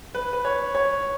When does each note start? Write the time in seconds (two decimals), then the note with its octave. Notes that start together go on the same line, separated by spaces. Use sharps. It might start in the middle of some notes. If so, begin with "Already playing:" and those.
0.15 B4
0.33 B4
0.45 C#5
0.75 C#5